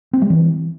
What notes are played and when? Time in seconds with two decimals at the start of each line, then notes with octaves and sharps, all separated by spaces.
0.13 C4
0.22 G3
0.30 E3